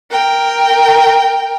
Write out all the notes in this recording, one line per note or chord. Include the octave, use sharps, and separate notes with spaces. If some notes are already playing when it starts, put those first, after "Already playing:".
A#4 G5